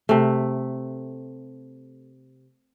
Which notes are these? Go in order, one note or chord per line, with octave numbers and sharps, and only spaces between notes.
C3 A3